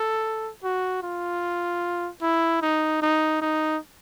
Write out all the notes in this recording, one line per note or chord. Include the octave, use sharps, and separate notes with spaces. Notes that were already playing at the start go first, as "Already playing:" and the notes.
Already playing: A4
F#4
F4
E4
D#4
D#4
D#4